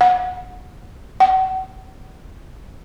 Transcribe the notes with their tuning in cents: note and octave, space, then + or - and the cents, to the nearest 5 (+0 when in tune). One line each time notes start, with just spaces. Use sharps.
F#5 -20
F#5 +35